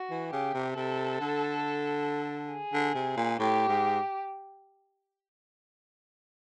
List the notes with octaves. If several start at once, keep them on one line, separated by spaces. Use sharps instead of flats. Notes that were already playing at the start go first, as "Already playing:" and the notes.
Already playing: F#4
E3
C#3 G4
C3
C3 A4
D3
G#4
D3
C3
A#2
A2 G4
G#2